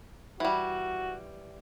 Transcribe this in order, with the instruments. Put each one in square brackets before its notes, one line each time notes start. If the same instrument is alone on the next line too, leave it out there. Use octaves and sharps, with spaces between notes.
[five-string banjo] E3 G3 [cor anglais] F#4